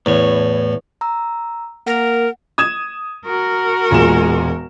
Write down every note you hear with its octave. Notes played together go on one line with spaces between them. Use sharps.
E2 A2 C#5
A#5 E6
A#3 A#4 F#5
D#6 G#6 E7
F#4 A#4
E1 A#2 G#3 E7